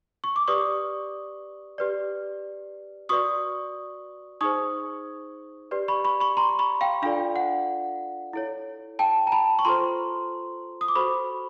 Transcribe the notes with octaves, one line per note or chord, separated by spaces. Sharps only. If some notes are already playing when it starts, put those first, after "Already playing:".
C#6
D6
G4 B4 D5 C#6 D#6
G4 B4 D5
F#4 B4 D5 C#6 D#6
D#4 G#4 C5 C#6 D#6
G4 B4 D5
B5 C#6
B5 C#6
B5 C#6
A#5 C6
B5 C#6
F5 G5
D4 F4 A4 D5 F5
F#5
E4 A4 C#5
G5 A5
A#5
A5 B5
C#6
F4 A4 C5 A#5 C6
D#6
D6
F#4 A4 C5 B5 C#6